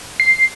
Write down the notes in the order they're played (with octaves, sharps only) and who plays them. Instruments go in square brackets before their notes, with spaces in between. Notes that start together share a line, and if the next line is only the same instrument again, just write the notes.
[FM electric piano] C7